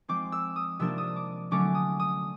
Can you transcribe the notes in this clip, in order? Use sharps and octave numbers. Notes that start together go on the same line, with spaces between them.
F3 G#3 C4 D6
E6
D#6
C3 F3 A#3 D4 E6
D#6
D6
D3 F#3 A3 C#4 D6
D#6
D#6